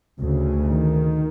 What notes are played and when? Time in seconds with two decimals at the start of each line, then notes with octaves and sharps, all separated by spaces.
0.21 D2 C#3
0.67 D#3